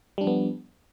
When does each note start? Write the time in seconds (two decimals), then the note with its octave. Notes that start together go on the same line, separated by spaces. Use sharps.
0.18 G3
0.21 D4
0.24 F3
0.27 B3